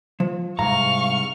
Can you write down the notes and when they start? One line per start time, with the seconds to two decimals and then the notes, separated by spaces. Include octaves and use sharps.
0.20 F3
0.59 C2 G#2 G#3 F5 A#5 C#6 F6